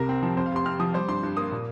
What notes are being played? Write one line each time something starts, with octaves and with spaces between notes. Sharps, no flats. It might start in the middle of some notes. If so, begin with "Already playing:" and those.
Already playing: C2 C3 A#4
C4
F3
F2 C5
F5
F1 C6
C4 F6
F3 D#6
G3 C5
G2 C6
G2
A#3 D#6
A#2